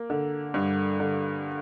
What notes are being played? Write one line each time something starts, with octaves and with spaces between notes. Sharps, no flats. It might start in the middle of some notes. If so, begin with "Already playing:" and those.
Already playing: A#3
D3
G2
D3